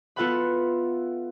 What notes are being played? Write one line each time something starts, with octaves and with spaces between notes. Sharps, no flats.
B3 F4 A4 E5 F#5 B5